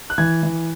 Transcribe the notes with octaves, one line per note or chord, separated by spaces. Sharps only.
F#6
E3 G#6
E3